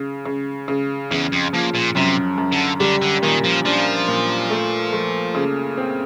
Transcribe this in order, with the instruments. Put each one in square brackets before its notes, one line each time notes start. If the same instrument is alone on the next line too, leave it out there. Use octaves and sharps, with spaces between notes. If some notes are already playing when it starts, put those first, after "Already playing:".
Already playing: [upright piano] C#3
C#3
C#3
[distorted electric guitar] E2 [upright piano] C#3
[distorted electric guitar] F2
[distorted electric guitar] A#2 [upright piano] F3
[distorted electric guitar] A#2
[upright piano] F#2 [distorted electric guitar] C3
[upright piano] F#2
[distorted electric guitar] D3
[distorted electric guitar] D3 [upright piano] G3
[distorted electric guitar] D3
[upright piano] A#2 [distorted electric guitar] D#3
[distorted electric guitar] F3
[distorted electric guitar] F3 [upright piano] D4
[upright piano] A#2
A3
A3
C#3
C4